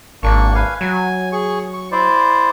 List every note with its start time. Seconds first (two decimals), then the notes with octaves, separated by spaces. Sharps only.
0.23 G#1 A#3 D4 C#6
0.55 B4 F5 G#5
0.81 F#3 G#5
1.32 G#4 C#6
1.74 C#6
1.92 E4 C5 D5